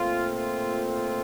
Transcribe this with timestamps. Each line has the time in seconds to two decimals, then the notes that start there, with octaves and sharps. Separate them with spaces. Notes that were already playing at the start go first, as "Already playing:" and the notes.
Already playing: A#2 A3 C4 F4
0.35 F4
0.87 F4